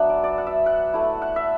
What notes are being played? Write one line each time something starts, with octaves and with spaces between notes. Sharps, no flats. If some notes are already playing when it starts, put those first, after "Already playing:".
Already playing: F#3 B3 D4 E5 F#5
D5
D5
F#5
E5
F#5
A3 E4
F#5
E5